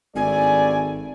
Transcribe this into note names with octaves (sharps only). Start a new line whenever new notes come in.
G#1 G2 A3 D5 G#5